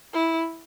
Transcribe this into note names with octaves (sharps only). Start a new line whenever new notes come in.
E4